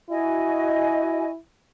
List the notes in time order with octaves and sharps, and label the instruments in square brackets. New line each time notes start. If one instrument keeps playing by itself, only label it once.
[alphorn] E4 [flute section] F#4 D#5 G#5